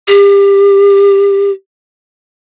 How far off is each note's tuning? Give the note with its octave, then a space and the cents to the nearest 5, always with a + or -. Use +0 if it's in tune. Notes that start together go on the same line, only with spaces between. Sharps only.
G4 +25